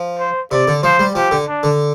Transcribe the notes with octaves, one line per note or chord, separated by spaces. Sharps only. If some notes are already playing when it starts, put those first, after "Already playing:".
Already playing: F3
C5
C3 D5
D3
F3 C5
G3
F3 G4
D3
D4
D3